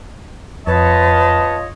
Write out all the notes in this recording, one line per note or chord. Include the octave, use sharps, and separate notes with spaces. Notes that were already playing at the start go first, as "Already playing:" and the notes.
F2 F4 B4 C#5 D#5 A5